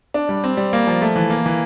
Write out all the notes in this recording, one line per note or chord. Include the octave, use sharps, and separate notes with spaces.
D4
G3
C4
G3
A#3
F3
A3
E3
A#3
E3